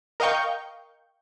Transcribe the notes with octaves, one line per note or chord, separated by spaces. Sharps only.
A#4 D#5 F5 G5 C#6 G6